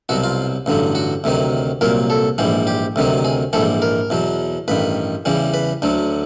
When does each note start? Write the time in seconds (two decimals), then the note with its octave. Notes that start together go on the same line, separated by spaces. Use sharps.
0.09 C2 B2 F#3 F#4
0.24 F4
0.66 A1 G2 D3 F#3
0.95 F#4
1.24 D2 C3 D#3 F#3
1.81 C2 A#2 F#3 A#4
2.10 A4
2.38 A#1 G#2 E3 G3
2.67 G4
2.96 D2 C3 D#3 F#3
3.25 G#4
3.53 A#1 G#2 E3 G3 A4
3.82 A#4
4.10 E2 B2 F#3
4.68 A1 G2 D#3 B4
5.25 E2 C#3 E3 G3
5.54 B4
5.82 D2 D3 F#3